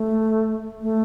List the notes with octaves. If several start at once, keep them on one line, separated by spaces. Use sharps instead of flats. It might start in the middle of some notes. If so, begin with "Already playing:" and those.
Already playing: A3
A3